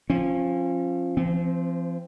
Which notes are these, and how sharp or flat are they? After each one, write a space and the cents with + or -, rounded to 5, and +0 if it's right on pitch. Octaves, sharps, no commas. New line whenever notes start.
F3 +0 C#4 -35
F3 -35 C4 +0